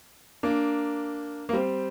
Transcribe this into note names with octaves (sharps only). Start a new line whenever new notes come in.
A#3 D4
A#3
G3 C4